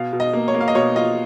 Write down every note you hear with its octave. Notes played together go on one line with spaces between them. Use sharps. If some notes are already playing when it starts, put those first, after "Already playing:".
Already playing: B2 F5
B2
D#5
A#3
C#5
A#3
F5
D#5
B2 C#5
F4 D#5